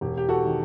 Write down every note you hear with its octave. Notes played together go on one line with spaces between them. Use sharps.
E1 G4
G4
F#4 A4
D#3